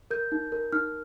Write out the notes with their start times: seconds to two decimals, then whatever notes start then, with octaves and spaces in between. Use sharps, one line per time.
0.11 A#4 G6
0.32 D#4
0.52 A#4
0.72 D#4 F6